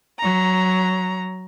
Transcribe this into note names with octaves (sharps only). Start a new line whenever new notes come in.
F#3 A#5